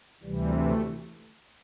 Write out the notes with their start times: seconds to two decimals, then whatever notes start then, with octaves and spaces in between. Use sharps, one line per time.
0.23 D2 C3 E3 G3
0.54 A3